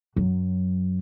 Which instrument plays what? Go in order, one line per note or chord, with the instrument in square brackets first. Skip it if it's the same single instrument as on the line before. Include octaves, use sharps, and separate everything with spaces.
[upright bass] F#2 F#3